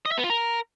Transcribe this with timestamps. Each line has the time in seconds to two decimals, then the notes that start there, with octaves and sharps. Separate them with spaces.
0.06 D#5
0.12 E5
0.18 B3
0.24 F4
0.30 A#4